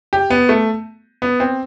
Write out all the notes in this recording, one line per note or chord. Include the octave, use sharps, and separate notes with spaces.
G4
B3
A3
B3
C4